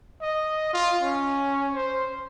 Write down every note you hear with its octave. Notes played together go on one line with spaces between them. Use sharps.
D#5
F4
C#4
C5